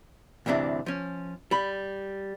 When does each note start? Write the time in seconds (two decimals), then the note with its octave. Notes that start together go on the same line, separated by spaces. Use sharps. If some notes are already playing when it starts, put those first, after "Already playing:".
0.46 D2 G2 C3 E3 D4
0.86 F3 C#4
1.51 G3 B5